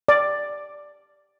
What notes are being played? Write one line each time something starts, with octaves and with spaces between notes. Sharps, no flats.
D5